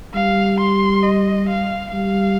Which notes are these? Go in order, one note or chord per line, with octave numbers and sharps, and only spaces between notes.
G3 F5
C6
D#5
F5
G3 F5